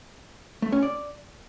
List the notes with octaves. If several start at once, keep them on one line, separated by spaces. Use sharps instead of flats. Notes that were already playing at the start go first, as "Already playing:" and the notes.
A3
C#4
D5